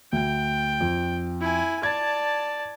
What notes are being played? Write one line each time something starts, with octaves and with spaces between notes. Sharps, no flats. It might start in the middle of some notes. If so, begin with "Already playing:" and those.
D2 G5
F2
E4 G#5
D5 A5 G#6